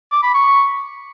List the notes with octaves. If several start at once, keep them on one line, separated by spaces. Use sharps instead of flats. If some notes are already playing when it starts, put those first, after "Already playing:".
D6
B5
C#6